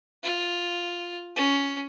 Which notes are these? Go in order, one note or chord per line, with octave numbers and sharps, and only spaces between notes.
F4
C#4